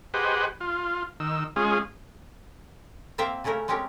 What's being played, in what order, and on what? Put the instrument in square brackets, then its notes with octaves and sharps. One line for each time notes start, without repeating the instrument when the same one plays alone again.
[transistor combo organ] G4 G#4 B4 C5 D#5 F#5
F4
D#3 E6
G#3 C#4 F4 G#4
[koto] A#3 C4 C5 E5 F5 G5
C#3 A3 C#4 E4 A#4
G#3 C4 C#4 G4 A#4